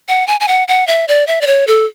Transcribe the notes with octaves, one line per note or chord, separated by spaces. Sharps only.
F#5
G#5
G#5
F#5
F#5
E5
D5
E5
D5
C#5
A4